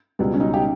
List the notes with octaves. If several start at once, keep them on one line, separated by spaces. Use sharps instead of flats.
C#2 B2 G3
C#4
D#4
G4